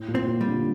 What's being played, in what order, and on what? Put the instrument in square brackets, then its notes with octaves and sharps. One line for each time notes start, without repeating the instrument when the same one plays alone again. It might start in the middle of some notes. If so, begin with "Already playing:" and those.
Already playing: [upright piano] A2
A#2
[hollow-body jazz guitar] C4
[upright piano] A#2
[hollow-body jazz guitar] G3
[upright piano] A#2 D3